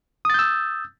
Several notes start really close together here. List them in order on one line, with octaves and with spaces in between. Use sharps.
D#6 A6 G6 E6